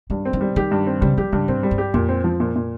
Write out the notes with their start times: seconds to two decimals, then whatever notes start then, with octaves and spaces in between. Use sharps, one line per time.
0.10 G2 D#3
0.25 C4
0.33 D#3
0.41 G3
0.56 D#3 G4
0.71 G2
0.87 C4
1.01 C#3 G3
1.18 F3 G4
1.32 G2 C#3
1.48 G#2 C4
1.63 G3
1.71 G2
1.78 G4
1.94 F2 A#2
2.09 C4
2.24 F3
2.40 A#2
2.56 A#2